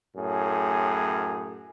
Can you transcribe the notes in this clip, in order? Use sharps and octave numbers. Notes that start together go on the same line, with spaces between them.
F#2 A2 G#4